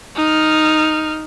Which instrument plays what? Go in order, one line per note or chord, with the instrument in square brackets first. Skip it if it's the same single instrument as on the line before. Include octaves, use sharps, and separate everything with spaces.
[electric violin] D#4 F6